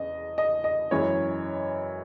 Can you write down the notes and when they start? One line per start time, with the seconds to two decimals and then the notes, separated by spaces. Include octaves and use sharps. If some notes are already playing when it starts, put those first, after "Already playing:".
Already playing: E2 C#3 D#5
0.38 D#5
0.64 D#5
0.91 F#2 E3 G#3 C#5